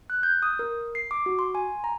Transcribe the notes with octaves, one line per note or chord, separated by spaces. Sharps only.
F#6
G6
D#6
A#4
C7
D6
F#4
C6
G#5
A#5